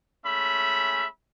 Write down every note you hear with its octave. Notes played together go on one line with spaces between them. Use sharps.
G#3 A3 C#4 E5 B5